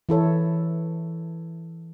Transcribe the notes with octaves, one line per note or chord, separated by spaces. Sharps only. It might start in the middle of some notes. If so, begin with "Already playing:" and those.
E3 E4 A4 C#5